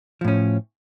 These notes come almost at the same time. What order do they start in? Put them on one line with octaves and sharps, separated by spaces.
F3 A2 C#4